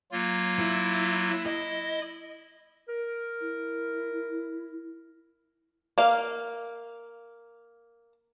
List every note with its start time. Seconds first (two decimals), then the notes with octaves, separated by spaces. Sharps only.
0.12 F#3 A#3 F4
0.60 E4
1.46 E4 D#5
2.89 A#4
3.41 E4
5.98 A#3 F5